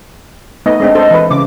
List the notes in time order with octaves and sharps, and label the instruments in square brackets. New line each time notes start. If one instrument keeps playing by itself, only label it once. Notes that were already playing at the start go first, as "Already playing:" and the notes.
[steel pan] A3 B3 D#4 [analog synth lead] D#5
[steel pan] G#3 C4 D4
D4 A4 C5
E3 B4
[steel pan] C#3 [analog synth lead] D6